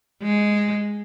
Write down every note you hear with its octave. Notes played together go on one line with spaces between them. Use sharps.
G#3